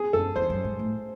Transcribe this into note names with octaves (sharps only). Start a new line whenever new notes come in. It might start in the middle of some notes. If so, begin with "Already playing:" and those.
Already playing: G#4
F#2 A4
E2 C5
F#2
G#2
A2